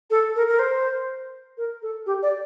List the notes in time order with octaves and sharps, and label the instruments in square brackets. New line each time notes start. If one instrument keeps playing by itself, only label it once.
[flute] A4
A#4
A#4
C5
A#4
A4
G4
D5